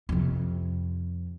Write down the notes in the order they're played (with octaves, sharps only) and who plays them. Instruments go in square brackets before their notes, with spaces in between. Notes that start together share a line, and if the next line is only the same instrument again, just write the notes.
[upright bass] F2 C3